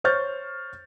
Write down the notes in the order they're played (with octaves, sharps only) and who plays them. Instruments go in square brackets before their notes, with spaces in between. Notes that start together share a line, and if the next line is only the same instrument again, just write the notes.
[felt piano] C5 C#5 C#6 F6 G6 A6